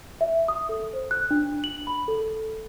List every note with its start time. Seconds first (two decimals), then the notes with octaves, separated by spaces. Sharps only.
0.21 E5
0.48 D#6
0.69 A4
0.93 C5
1.11 F#6
1.31 D4
1.64 F#7
1.87 B5
2.08 A4